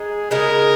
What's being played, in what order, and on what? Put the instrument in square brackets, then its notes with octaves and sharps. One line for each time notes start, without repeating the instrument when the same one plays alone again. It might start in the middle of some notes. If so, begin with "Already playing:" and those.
Already playing: [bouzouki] G#3 D#4 [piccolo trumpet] G#4
[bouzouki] C#3 G#3 D#4 G#4 [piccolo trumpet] A#4